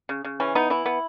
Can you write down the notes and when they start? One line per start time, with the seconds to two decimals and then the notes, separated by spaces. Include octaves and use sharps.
0.09 C#3
0.25 C#3
0.40 E3 C#4
0.55 B3 D#4
0.70 E3 E4
0.86 B3